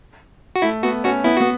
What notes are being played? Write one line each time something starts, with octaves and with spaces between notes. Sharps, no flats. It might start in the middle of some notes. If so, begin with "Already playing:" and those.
F#4
A3 E4
B3 F#4
C#4 F#4
B3 E4
B3 F#4